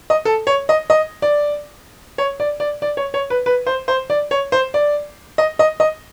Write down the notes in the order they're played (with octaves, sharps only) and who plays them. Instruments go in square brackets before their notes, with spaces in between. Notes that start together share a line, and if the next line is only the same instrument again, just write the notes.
[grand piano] D#5
A4
C#5
D#5
D#5
D5
C#5
D5
D5
D5
C#5
C#5
B4
B4
C5
C5
D5
C#5
C5
D5
D#5
D#5
D#5